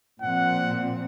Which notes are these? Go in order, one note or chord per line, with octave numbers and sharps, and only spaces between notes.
A#2 F3 C4 F#5